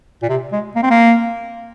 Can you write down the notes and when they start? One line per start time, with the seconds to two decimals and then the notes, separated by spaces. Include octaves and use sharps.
0.22 A#2
0.29 C3
0.52 G#3
0.75 A#3
0.83 C4
0.90 A#3